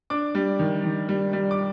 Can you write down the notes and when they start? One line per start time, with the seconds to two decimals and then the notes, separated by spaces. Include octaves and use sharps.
0.10 D4 D6
0.35 G3
0.59 D#3
0.84 D#3
1.09 G3
1.33 G3
1.51 D6